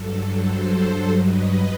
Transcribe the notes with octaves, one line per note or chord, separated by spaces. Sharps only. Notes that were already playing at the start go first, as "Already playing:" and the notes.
Already playing: G2 F#3 A4
A4 C5
B4 D#5